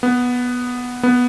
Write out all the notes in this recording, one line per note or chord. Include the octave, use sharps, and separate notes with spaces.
B3
B3